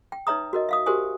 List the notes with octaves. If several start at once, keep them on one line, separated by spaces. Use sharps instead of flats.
G5
D#4 B4 C#5 E5 A#5 D#6
F#4 A#4 D#5
E5 F5 D#6
F#4 G4 A#4 C5 G#5 D#6